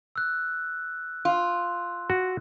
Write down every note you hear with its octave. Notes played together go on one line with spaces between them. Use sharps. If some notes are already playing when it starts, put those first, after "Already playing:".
E6 F#6
F4
F#4